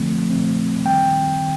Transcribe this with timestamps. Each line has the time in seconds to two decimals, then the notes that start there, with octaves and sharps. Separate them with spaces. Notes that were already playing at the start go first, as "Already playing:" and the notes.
Already playing: D3 F3 A3 C4
0.30 D3 F3 A3 C4
0.85 D#3 G3 C4 G5
1.41 D#3